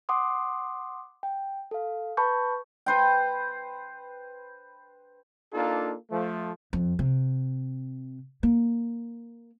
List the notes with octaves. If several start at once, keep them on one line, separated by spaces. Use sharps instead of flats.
F#5 C6 D6 D#6
G5
A4 F5
B4 A5 B5 C#6 G6
B4 C5 G5
A#3 D4 D#4 F4 A4
F3 A3
F2
C3
A#3